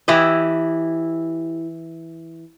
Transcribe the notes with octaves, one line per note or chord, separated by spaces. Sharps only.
E3 E4 G4 D#5